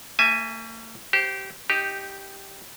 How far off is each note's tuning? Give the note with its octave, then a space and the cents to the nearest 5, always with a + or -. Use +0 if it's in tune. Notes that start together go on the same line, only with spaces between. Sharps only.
A#3 -45 E5 +0 G#5 +0
G4 -20 C5 +0
D#4 +0 G4 +0